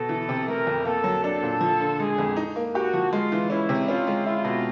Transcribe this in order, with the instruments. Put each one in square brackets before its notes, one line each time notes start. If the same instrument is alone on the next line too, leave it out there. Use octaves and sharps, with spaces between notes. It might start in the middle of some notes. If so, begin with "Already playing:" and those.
Already playing: [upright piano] B2 [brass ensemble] A4
[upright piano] E3
C3
[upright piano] A3 [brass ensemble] A#4
[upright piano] F2
[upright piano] A#3 [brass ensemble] A4
[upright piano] F#3
[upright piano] D4 [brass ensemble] A4
[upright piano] A#2
F3
D3
[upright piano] G#3 [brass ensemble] G#4
[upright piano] F2
D#4
A#3
[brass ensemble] F#4 [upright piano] G4
[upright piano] F3
[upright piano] G#3 [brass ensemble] F4
[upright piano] E3
[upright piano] C#4 [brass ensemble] E4
[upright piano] C3
[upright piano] C#4 [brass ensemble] F4
[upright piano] G#3
[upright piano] E4 [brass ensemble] F4
[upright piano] B2